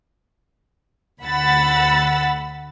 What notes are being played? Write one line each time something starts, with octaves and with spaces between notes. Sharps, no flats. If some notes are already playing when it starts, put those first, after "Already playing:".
D2 F#5 B5 E6 A6